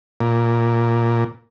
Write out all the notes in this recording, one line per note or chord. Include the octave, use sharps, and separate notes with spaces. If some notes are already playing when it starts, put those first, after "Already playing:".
A#2